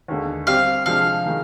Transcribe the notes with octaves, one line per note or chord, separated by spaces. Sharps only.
D#2 D3 G#3
G3 C4 G4 F5
C3 F3 G#3 D4 F5
D#3 G#3